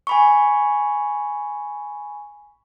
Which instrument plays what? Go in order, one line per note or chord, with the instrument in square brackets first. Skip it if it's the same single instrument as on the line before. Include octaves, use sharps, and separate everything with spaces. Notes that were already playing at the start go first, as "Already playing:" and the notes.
[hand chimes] G#5 B5 C#6